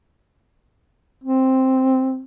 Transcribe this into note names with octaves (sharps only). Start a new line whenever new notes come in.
C4